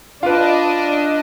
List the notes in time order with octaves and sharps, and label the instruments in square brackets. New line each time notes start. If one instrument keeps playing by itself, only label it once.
[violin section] D4 D#5 [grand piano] F4 B4